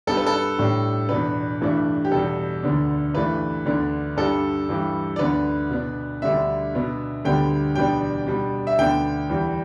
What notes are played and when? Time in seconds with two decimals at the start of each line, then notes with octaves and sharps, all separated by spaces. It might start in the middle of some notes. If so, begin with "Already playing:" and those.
0.07 G2 G3 B3 A4
0.17 B4
0.27 A4
0.59 A2 G3 D4
1.09 E2 B2 B3 D4 B4
1.61 G2 E3 A3 D4
2.05 G4
2.12 E2 B2 G3 A4
2.63 D2 D3 B3 D4
3.14 G2 E3 A3 D4 B4
3.65 D2 D3 B3 D4
4.17 G2 G3 D4 A4
4.69 G2 E3 G3
5.16 D5
5.19 D2 D3 B3 D4 B4
5.71 B2 B3 D4
6.22 D2 D3 G3 D4 E5
6.74 B2 B3 D4
7.24 D2 D3 G3 B3 D4 G5
7.75 E2 B2 G3 B3 D4 G5
8.27 B2 G3 D4
8.67 E5
8.78 D2 D3 B3 D4 G5
9.29 E2 E3 G3